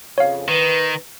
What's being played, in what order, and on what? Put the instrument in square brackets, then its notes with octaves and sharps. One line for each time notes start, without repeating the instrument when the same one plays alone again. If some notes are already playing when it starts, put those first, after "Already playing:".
[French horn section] F2 C#3 [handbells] C#5 F5
[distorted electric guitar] D#3 [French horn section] B4